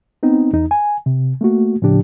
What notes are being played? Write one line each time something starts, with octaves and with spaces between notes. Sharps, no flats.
B3 C4 D#4
E2 D#4
G#5
C3
A3 A#3 F#4
A2 C#3 F3 D4 G4